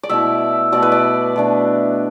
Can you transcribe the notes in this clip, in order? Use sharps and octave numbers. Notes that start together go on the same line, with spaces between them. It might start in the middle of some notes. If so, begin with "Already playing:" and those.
D5
B2 A3 E4 E5
B2 A3 E4 D5
B4
D5
B2 A3 D4